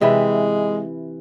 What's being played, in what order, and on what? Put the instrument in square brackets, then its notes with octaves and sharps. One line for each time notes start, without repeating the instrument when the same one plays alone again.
[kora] C3 E3 B4 [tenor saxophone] G#3